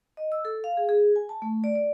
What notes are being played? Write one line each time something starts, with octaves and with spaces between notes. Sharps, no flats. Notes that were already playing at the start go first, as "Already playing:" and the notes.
D#5
E6
A4
F5
G#4
G#4
G#5
A5
A3
D5
D5